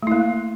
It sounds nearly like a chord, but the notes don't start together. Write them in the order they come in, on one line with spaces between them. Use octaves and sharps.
A3 E4 A#3